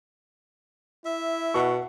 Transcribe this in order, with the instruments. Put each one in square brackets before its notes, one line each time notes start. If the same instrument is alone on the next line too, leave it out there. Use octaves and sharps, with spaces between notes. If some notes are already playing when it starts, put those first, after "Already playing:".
[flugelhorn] E4 [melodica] E5
[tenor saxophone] B2 [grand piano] F#5 A5 C#6